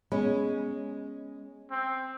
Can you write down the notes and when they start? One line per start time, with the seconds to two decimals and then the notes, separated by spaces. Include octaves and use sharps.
0.12 G#3 B3 C#4
1.71 C4